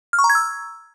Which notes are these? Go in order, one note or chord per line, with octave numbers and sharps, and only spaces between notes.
F6
C#6
A#5
G#6
E6